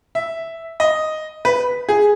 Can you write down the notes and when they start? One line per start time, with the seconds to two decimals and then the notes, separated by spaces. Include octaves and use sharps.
0.15 E5
0.80 D#5
1.45 B4
1.89 G#4